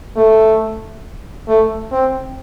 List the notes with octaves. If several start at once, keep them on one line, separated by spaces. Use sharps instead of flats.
A3
A3
C4